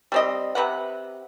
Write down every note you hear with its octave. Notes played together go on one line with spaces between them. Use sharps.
G3 C4 D#5
C3 B4 F#5